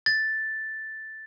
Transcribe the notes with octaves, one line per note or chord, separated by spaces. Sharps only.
A6